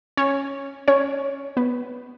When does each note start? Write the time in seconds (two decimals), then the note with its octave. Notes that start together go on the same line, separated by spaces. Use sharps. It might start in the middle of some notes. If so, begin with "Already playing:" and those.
0.17 C#4 C#5
0.88 C#4 C#5
1.57 B3 B4